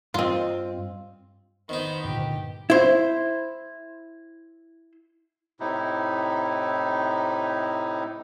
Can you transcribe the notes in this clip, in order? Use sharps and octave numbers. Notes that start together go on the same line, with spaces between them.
G2 C4 F4 D#5
D#3 B3 D#4 C5
G2 A#2 D3 G4
E4 C5
A2 C3 D#4 E4